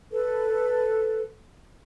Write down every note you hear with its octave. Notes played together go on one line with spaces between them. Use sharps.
A4 B4